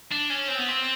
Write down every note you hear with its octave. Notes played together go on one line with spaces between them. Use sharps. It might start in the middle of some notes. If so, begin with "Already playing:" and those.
D4
C#4
C4
B3
C4